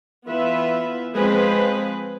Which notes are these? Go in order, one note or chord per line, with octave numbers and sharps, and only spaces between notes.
E3 B3 F4 B4 E5
F3 G#3 C4 G#4 B4